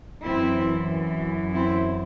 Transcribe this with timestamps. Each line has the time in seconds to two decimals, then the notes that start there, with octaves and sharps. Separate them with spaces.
0.23 F#2 E3 C4 E4
1.53 C4 E4